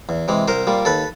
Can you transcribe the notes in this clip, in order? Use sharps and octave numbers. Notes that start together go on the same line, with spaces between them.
E2
C3 E3 G#3
C2 A#4 C5
A#2 G3
D#2 A4 B4